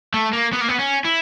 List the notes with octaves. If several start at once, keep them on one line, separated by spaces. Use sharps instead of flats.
A3
A#3
B3
A#3
B3
C#4
E4